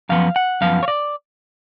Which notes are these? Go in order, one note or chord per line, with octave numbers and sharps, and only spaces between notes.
F#2 F3 B3 F5
F#5
F#2 F3 B3 F5
C#5
D5